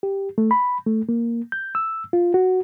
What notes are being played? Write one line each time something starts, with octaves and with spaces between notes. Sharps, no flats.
G4
A3
B5
A3
A#3
G6
E6
F4
F#4